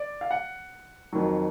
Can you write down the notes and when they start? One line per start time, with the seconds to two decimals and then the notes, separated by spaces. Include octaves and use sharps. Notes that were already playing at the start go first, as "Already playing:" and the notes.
Already playing: D5
0.21 F5
0.31 F#5
1.13 F2 D#3 F#3